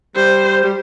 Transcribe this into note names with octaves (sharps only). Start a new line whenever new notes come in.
G3 C5
G3